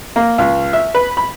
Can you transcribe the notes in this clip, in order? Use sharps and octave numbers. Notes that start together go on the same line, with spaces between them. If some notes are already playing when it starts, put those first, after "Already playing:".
A#3
C#2
E5
B4
B5